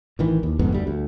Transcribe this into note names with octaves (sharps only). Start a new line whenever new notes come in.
A1 D#3 E3
D#2
G1 F2 G#2 B3
D2 G3
D2